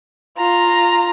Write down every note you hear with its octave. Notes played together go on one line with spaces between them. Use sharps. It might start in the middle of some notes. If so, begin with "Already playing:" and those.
F4 A#5